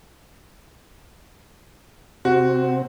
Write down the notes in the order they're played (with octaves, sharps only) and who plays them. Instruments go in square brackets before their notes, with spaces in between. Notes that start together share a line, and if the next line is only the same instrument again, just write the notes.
[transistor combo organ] C3 C4 [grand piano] F#4